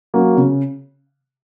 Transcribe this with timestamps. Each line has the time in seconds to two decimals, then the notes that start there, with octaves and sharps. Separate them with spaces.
0.14 F#3 A#3 C#4 F#4
0.37 C#3